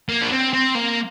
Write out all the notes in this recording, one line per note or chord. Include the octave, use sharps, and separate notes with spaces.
A#3
D4
C4
C4
A#3